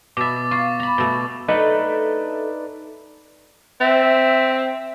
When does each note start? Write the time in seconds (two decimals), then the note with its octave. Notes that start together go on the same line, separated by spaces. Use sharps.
0.17 B2 E5 D6 A6
0.51 F4 C#6 A6
0.80 A#5 B5
0.98 B2 A3
1.48 A3 D4 D#4 A4 B4 D5 D#5 F#5
3.81 C4 E5